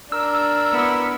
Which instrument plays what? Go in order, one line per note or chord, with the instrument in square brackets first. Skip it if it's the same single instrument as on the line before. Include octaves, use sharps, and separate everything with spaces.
[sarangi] D4 [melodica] A#4 [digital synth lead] E6
[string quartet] B3 E4